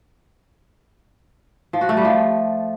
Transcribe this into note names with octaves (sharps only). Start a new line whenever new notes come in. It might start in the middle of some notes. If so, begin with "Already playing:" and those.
F3
F#4
A3
G3
F3